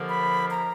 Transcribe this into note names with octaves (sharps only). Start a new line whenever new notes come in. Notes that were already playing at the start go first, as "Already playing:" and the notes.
Already playing: D#2 D3 F3 A#3
B5
A#5